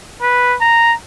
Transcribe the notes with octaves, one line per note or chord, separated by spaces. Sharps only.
B4
A#5